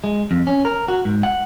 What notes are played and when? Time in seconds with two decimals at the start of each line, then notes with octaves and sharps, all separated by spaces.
0.04 G#3
0.31 F2
0.47 C#4
0.65 A#4
0.88 F#4
1.05 G#2
1.23 F#5